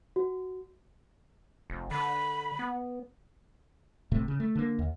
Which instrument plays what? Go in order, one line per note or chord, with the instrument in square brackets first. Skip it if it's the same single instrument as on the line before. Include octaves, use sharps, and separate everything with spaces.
[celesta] F#4
[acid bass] F1
[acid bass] D3 [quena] B5
[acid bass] B3
[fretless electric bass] D1 A2 C3 A3
C#3
A3
D3 A#3
D#2